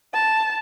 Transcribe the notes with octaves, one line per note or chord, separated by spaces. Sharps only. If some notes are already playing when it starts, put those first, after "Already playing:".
A5